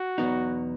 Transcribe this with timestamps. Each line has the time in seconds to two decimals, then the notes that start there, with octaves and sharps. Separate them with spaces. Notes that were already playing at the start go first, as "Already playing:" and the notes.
Already playing: F#4
0.18 E2 B2 F#3 B3 D#4